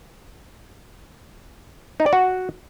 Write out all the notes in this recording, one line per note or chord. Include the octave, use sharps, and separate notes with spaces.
D#4
D5
F#4